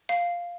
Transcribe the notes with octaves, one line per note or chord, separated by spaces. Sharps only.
F5